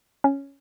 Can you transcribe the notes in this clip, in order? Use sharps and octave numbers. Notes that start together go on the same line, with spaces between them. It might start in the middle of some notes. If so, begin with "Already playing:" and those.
C#4